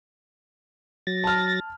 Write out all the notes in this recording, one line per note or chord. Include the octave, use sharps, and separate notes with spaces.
F#3 A6 A#6
A5 F6